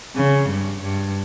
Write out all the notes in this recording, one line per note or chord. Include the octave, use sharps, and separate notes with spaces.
C#3
G2
G2